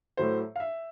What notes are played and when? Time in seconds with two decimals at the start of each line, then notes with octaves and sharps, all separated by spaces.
0.17 A2 F#3 A3 C5
0.56 F5
0.60 E5